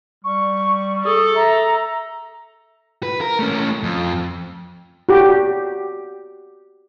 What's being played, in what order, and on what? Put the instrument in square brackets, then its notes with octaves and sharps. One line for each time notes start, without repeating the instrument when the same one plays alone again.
[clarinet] G3 [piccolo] C#6
[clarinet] G#4 [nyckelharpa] A4
[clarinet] E5 [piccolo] A#5
[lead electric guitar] B4
A#4
A3 C#4
F2
[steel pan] F#4 G4